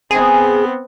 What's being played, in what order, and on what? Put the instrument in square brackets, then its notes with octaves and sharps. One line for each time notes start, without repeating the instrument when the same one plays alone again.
[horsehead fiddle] B3 C4 [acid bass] G#4